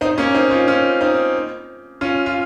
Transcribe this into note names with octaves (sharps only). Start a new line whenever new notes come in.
C4 D#4
A#3 C#4
C4 D#4
C#4 F4
C#4 F4
C4 D#4
C#4 F4
F4